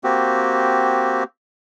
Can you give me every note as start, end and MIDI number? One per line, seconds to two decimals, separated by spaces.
0.04 1.24 58
0.04 1.24 60
0.04 1.24 66
0.04 1.24 67